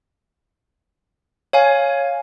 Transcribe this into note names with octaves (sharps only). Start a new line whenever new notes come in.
C#5 F5 G#5